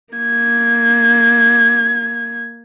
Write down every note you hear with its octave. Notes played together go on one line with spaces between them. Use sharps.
A#3 G#6